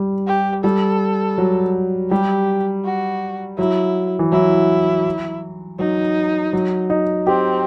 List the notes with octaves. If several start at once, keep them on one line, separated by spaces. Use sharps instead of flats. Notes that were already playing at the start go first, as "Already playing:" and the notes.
Already playing: G3
G4
G3 A4
F#3
G3 G4
F#4
F#3 E4
E3
F#3 E4
F#3 D#4
F#3
D#4
C4 G4